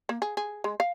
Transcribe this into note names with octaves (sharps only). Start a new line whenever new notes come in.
A#3
G#4
G#4
G#3
F5